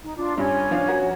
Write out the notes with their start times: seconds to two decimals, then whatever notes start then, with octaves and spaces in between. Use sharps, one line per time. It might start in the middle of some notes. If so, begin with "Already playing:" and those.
0.03 D#4
0.17 D4 F4
0.38 G2 C#4 C#5 G#5
0.71 F3 D4 F5
0.88 F#4 A#4